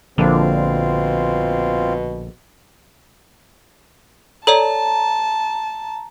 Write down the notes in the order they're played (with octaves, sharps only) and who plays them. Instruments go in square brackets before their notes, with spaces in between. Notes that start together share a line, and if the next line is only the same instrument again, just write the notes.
[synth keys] A#1 [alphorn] B2 [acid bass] D3 [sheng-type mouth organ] C4 F4
[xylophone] A4 C#5 D5 [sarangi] A5 [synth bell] A#5